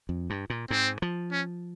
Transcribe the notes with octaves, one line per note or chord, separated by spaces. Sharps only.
F2
G2
A#2
G#2 C4
F3
C#4